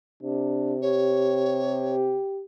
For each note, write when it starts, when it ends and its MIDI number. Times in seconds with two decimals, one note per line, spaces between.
0.23 2.17 48
0.23 0.75 62
0.82 2.44 67
0.82 1.95 73